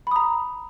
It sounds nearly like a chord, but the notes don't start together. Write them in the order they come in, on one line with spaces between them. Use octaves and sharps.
B5 D#6 A#5